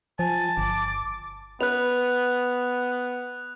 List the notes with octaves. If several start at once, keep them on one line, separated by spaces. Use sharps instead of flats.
F3 G#5 A5
G1 D6
B3 B4 F#6 F7